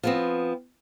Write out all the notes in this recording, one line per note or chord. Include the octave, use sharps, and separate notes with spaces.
F3 B3 C4